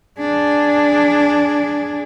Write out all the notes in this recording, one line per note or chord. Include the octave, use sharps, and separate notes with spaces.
D4 G#4